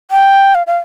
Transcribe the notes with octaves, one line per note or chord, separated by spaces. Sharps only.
G5
F5
F5